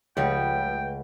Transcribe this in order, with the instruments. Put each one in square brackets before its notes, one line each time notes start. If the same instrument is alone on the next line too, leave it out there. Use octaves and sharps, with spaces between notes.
[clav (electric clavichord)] C#2 [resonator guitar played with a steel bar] F3 G3 C#5 [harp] A3 B4 F#5 [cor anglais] G5